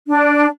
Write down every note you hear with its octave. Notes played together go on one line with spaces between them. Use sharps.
D4